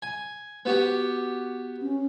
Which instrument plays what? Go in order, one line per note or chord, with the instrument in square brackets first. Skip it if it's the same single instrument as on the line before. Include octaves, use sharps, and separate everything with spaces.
[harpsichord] G#5
B3 F#4 G4
[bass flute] C#4